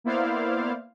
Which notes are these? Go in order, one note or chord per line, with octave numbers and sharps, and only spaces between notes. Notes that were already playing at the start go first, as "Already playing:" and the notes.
A#3 B3 E4 C5 D5 F5